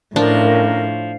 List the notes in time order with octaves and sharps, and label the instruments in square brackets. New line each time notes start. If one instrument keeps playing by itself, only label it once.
[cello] A2 [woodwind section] D#3 C#4 A#4 [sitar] F3 [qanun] D4